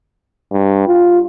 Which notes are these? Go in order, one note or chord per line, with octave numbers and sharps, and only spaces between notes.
G2
F4